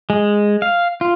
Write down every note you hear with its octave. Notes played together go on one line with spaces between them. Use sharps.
G#3
F5
F4